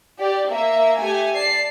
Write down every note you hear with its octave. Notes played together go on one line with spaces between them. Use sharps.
G4 D5
A#3 E5
A3 G4 G#5
D5 A5 C7